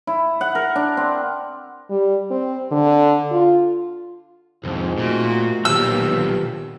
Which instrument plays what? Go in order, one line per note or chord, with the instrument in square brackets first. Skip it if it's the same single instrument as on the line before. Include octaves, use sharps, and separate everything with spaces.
[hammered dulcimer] E4
F#5
A#4
D4
C4
[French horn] G3
C4
D3
F4
[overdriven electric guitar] C2 F2 [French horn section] G#2 C4
[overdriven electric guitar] A#2 [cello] A3 F#4
[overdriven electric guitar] B1 F3 [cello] A#2 D#3 [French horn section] B3 G4 [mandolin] E6